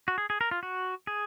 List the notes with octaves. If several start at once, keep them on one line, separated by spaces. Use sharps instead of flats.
F#4
G#4
G#4
A#4
F4
F#4
G#4